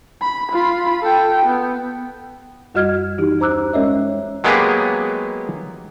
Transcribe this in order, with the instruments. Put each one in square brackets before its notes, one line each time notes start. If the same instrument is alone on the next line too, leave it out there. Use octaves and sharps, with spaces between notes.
[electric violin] B5
F4 B5
A4 G5
B3
[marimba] F#2 G3 F#4 D#5 F6 G#6
E3 D#4 E4 G4
D#2 C5 A#5 D6 E6 F#6
G#3 C#4 A#4 C#5 D#5 E5
[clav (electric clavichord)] F#3 G#3 A#3 B3 G4 G#4